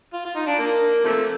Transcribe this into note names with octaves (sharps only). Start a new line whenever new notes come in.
F4
F4
D#4
D4
A#3
C3 F3 A3